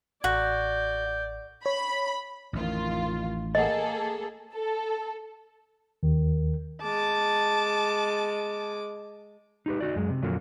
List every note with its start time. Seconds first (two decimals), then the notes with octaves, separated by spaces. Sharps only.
0.24 A1 F#4 D5 G6
1.66 C#5 B5
2.53 A1 F2 D#3 F4
3.55 A#3 G#4 A4 D#5 F#5
4.53 A4
6.03 D#2 D#3
6.82 G#3 A5 D6
9.66 D#4 G4 B4
9.80 D#4 F#4 D5
9.96 F#2 G#3
10.10 C3
10.22 F2 A#2 D3 F#3 A#3